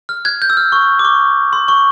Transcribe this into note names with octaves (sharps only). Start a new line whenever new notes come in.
F6
F#6 G#6
G6
E6
F6
C#6
D6
C#6
C6
C#6